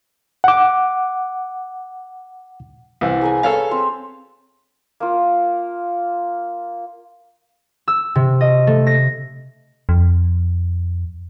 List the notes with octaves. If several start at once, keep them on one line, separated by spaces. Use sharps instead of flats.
F#5 D6
C2 E3
G#4 A#4 G#5
A4 B4 C#5 F5
C4 C5 E6
A#3 F4
E6
C3
D#5
A3
A#6
F2